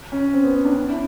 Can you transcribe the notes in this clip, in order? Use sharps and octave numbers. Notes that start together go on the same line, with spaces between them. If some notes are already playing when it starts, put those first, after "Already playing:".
C#4
C4
B3
C4
D4
C#4
E4